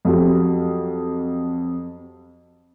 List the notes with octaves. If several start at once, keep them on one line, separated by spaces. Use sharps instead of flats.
F2 F#3 G4